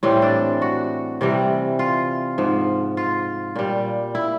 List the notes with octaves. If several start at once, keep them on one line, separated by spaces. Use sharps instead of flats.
A2 E3 G3 C4
D4
F#4
C3 E3 G3
F4
G#2 F3
F4
A#2 G3
E4